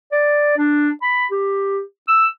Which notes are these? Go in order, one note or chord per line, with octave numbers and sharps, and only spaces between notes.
D5
D4
B5
G4
E6